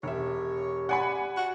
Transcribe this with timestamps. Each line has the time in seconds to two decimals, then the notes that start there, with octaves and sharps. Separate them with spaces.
0.03 E1 G4 C#5 E5
0.89 D5 F#5 G#5 B5
1.37 F#4